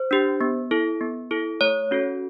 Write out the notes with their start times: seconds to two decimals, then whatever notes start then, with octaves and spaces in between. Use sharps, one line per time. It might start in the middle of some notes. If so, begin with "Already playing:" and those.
Already playing: C5
0.11 D4 G4
0.41 B3
0.71 E4 A4
1.01 B3
1.31 E4 A4
1.61 A3 C#5
1.91 C#4 F#4 A4